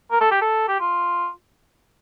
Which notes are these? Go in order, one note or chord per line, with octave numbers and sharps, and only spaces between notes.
A#4
A4
G4
A4
G4
F4